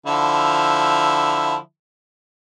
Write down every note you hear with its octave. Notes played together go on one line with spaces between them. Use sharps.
D3 F3 E4